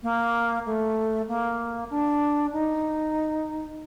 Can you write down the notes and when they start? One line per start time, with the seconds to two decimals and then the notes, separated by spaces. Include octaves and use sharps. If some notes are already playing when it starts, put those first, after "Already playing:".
0.03 A#3
0.66 A3
1.28 A#3
1.90 D4
2.52 D#4